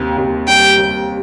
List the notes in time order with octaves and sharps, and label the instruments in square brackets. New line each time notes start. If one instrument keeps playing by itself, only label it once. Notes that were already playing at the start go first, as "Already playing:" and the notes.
Already playing: [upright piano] D#2 C3
D#2
[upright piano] G3 [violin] G5
[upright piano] D#2